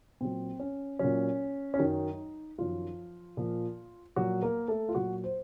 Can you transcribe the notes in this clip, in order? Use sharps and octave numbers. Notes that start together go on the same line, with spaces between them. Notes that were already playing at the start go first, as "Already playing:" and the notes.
A#2 F#3 C4
C#4
A#2 F#3 C#4
C#4
F#2 D#3 F#3 D#4
F#2 D#3 F3 F#3 F4
A#2 F3
A#2 F3 F#3 F#4
A#3 A#4
A3 A4
F4
A#2 F#3 F#4
C5